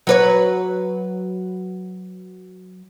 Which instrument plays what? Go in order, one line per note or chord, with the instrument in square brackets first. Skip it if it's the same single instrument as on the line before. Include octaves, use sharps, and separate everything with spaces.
[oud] F#3 B4 C#5